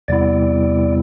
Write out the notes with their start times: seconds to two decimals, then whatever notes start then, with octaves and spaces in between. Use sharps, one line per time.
0.08 E2 C3 G3 B3 E4 D5